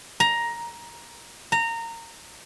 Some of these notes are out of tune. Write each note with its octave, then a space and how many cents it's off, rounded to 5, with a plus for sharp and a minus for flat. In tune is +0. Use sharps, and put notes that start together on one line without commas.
A#5 +10
A#5 -20